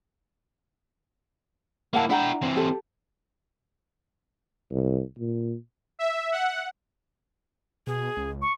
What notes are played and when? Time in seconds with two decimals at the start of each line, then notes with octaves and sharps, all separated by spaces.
1.93 A#3 E4 F5 F#5 A5
2.10 D4 E4 F#5 G5 A#5
2.42 E3 C4
2.56 G4 A4
4.71 C2
5.19 A#2
5.99 E5
6.32 F#5
7.87 B2 G#4
8.17 C#2
8.42 C#6